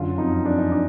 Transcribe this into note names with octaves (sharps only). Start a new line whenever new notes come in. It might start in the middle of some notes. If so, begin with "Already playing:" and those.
Already playing: F#2 D3 F4
F2 D#4
F2 D4
D#4
D4